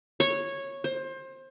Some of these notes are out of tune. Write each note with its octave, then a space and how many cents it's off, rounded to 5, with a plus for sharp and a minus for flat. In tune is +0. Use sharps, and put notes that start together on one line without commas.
C#5 -10
C5 +25